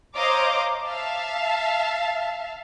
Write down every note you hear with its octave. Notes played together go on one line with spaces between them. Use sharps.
C5 C#5 D#5 F5 A#5 D6
E5 F5 A5